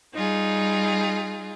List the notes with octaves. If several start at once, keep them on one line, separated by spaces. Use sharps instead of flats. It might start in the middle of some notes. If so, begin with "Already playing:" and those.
G3 D#4 F4 G#4